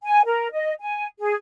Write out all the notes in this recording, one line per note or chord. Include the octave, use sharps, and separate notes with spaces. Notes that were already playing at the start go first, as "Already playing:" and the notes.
G#5
A#4
D#5
G#5
G#4